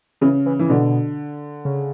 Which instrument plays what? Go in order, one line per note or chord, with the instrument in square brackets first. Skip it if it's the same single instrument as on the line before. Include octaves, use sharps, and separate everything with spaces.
[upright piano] C#3 [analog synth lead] E3
[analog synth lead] E3
[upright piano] E3
[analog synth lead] B2 [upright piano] D3
[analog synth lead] C#3